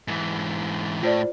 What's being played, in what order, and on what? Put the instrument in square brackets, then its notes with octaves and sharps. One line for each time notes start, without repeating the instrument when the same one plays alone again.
[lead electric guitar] G#2 E3
[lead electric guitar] A2 [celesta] F4 C5 D5